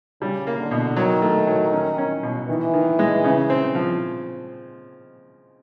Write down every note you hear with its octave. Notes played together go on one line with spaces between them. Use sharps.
C#3 G3
A#3
D3
B2
D#3 F#3
A3
F#3
C#4
C#4
B2
D#3 E3
D#3
G#3
C#3
C4
F3